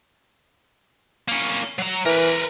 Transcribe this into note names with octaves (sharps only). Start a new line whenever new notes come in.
A#3 C#4
F#3 A#5
E3 A#4 B4